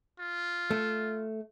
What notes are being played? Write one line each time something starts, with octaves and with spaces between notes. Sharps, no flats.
F4
A3